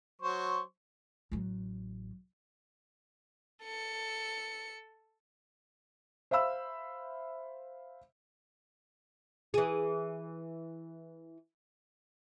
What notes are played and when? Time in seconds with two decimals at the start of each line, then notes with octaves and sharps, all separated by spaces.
0.22 F#3 C5 C#6
1.32 A1 F#3
3.64 A4 C#7
6.31 C5 E5 F5 B5 E6
9.54 E3 G#4